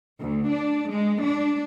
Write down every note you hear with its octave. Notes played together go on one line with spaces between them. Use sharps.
D2
D4
G#3
D4